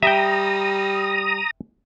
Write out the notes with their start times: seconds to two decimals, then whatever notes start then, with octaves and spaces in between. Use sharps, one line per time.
0.03 G3 E5 G5 A#5 D#6